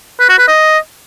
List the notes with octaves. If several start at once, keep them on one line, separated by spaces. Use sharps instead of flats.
B4
F#4
B4
D#5